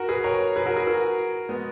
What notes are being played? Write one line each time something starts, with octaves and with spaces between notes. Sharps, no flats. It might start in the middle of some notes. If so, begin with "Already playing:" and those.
Already playing: F#4 A#4
G#4 B4
A#4 C#5
G#4 B4
F#4 A#4
G#4 B4
F#4 A#4
G#3 B3